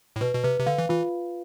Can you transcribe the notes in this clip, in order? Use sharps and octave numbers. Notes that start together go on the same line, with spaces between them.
A2
B2 B4
B2
C3 B4
C3
D3 F5
E3
E3 F4